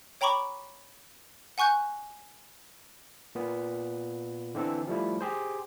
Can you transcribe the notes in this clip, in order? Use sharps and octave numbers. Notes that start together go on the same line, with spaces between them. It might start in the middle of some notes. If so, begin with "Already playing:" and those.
C#5 G5 A#5 B5 C#6 D6
F#5 G#5 C#6 F#6 G6
A#2 B3
D3 E3 C4 A4
F3 G3 A3 E4
G4 G#4 C5